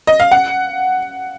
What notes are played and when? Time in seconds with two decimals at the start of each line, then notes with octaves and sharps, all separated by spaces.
0.07 D#5
0.20 F5
0.31 F#5